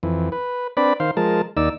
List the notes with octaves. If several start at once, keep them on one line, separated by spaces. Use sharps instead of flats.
F2 E3
B4
C4 D4 B4 D5 B5
D#3 C5 F5
F3 G#3 A#4 A5
D#2 D#4 D5 E6